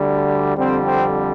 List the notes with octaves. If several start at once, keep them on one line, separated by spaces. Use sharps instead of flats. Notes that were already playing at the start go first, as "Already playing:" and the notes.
Already playing: D2 D3 G3
F2 D3 G3 C4
C4